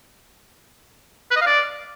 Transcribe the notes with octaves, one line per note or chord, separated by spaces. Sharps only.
B4
D#5
F5
D5